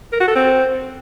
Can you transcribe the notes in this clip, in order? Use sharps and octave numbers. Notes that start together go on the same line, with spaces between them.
A#4
F#4
A4
C4